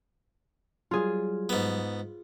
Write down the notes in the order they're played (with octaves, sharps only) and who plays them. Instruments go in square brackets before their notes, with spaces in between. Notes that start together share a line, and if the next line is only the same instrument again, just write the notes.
[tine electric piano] F#3 G3 [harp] F4 G#4
[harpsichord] G#2 B3